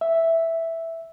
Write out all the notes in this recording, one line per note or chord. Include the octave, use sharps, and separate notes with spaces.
E5